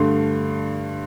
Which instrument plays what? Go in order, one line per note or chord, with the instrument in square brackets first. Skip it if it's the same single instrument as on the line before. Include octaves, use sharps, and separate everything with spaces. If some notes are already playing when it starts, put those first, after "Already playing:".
Already playing: [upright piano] G2 D3 A3 C6